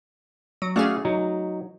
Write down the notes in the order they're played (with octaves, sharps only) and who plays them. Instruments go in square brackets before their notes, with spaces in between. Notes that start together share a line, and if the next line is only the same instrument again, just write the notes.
[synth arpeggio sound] F#3
[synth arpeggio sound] A3 C#4 G#4 [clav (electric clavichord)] F#4 D5 F5
[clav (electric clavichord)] F#3 D#4